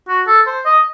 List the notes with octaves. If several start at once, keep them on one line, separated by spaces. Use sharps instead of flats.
F#4
A4
C5
D#5